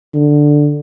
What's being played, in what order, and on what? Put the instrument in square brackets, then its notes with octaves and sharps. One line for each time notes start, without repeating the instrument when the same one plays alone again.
[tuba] D3